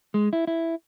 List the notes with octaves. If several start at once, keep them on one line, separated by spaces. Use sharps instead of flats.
G#3
E4
E4